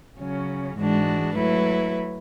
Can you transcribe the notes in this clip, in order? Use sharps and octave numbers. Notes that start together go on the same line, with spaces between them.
C#3 F#3 C#4
G#2 E3 G#3 D4 F#4
F#3 A3 E4 B4